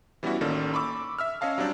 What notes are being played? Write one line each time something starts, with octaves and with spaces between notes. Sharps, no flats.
E3 G3 B3 C#4 E4 F#4
A1 D#3 A#3 C#4 A4 D5
B5 C#6 D6 E6
E5 E6 F6
C#4 C#5 D#5 F5 A5
F#3 G3 C4 D4 C5 D5